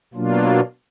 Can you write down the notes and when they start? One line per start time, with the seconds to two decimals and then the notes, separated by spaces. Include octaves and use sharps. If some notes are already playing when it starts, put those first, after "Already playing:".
0.14 B2 F#3 A#3 D4 F4